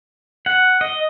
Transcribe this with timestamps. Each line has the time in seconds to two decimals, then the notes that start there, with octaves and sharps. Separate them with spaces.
0.46 F#5
0.81 D#5